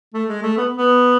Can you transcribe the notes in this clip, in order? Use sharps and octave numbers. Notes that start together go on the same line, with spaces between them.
A3
G#3
A3
B3
B3